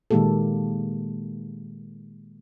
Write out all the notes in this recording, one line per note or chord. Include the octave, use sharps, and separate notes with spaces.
A#2 D#3 G#3 A#3 G4 A4